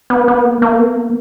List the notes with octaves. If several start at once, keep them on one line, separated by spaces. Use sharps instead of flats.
B3
B3
A#3
A#3
B3
A#3